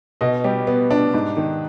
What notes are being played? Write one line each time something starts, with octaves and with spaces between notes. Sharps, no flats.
B2 D#5
G3 G4
B3
D4
G#2
D#3